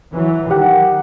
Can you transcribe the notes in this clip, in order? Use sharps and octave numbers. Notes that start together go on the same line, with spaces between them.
E3 F#3
D#3 G4 F#5